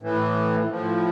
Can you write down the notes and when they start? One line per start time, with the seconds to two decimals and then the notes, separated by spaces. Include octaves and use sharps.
0.02 A2 E3
0.70 A2 F3